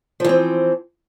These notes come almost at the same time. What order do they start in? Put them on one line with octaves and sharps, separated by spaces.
F3 E3 C4